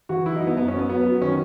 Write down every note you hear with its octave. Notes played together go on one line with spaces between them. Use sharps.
E3 F#4
F#3 E4
D#4
F#3
B3
F#2 B3
C#4
F#2
B3
F#3 B3
F#3
D#3 C#4